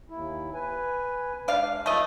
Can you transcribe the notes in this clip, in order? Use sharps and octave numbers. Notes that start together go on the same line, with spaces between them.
D#2 E4
B4 G#5
G#3 D4 D5 F5
F3 A3 D#5